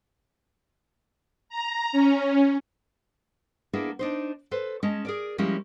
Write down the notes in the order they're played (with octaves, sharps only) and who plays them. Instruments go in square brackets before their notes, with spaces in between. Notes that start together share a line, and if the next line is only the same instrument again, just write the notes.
[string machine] A#5
C#4
[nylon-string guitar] A#3 B3 D4 E4 G#4
D4 D#4 C5
A4 B4 C5
G#3 C#4 D#5 A5
G#4 A#4 D5
F3 G3 G#3 A#3 C#4 E4